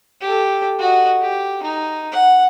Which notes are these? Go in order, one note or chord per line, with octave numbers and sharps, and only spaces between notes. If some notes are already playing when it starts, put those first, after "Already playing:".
G4 A4
F#4 D#5
G4
D#4
F#5